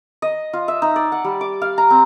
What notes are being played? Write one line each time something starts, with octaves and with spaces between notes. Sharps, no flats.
D#5
F4
E5
D#4
D5
F#5
G3
D6
F5
A#5
C4